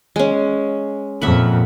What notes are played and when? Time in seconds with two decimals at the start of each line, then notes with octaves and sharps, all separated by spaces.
0.16 G#3 C#4
1.22 F2 A#2 E5 F#5 B5